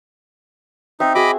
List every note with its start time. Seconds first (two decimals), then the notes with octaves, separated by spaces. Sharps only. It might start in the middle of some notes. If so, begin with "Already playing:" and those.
1.00 C4 D#4 E5
1.15 F#4 G#4 D#5 B5 D6